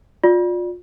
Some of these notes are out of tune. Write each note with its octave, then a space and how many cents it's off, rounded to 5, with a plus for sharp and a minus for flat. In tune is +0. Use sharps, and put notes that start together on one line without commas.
F4 +30 D5 +5